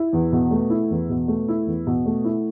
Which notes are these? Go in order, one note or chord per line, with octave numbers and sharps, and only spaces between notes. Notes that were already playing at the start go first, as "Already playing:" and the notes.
Already playing: E4
E2
B2
A3
E4
E2
B2
A3
E4
E2
B2
A3
E4